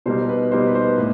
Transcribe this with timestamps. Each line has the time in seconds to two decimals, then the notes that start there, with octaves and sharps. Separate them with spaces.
0.06 B2 G3 A#3 D#4 C5
0.29 B4
0.51 B2 G3 A#3 D#4 C5
0.67 B4
0.75 C5
0.98 A2 B4